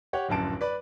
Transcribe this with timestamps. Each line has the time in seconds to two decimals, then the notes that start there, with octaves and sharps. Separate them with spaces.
0.13 G4 C#5 F#5
0.29 D1 A#1 F#2 A5 D7
0.61 B4 D5